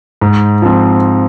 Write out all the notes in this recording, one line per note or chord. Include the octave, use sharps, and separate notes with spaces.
G#2
F3 C4